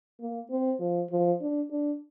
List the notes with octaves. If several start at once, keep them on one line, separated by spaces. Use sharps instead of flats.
A#3
C4
F3
F3
D4
D4